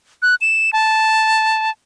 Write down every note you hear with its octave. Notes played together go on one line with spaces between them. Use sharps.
F#6
E7
A5